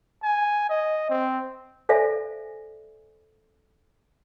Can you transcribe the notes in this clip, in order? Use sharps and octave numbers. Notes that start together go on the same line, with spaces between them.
G#5
D#5
C4
A4 C5 D5 E5 F5 G#5